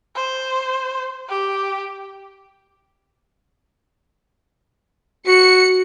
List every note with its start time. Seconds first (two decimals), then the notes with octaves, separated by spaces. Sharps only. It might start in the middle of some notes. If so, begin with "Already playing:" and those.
0.15 C5
1.29 G4
5.27 F#4 C#7